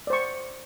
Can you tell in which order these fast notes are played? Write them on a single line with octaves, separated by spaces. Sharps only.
D5 C5 C#6